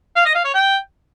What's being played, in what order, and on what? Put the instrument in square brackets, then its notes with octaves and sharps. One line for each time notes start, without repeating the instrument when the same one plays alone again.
[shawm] F5
D#5
F5
C#5
G5